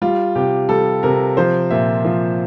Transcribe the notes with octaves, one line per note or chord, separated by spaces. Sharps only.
G3 F4
C3 G4
G3 A4
C3 A#4
F3 C5
A#2 E5
F3